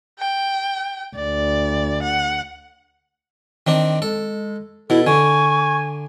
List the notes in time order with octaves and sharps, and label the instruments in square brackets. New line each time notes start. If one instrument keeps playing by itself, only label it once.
[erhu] G5
[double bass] D2 [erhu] D5
[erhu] F#5
[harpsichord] D#3 C4 D4
[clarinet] G#3 [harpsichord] A4
[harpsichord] B2 [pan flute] E4 [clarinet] A4
[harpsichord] D3 [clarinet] G#5 [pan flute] C#6